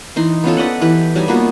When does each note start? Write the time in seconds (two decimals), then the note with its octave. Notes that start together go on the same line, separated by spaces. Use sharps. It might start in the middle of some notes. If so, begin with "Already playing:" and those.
0.16 E3 D#4 C6
0.44 B3 C#4 F4 A4
0.57 B4 D5 D#5 F#5
0.81 E3 G4 B4
1.15 F#3 G3 D#4 G#5
1.28 A#3 B3 F4 F#4